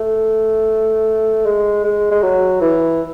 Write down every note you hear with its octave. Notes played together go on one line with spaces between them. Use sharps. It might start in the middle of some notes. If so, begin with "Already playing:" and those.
Already playing: A3
G#3
G#3
G#3
F#3
E3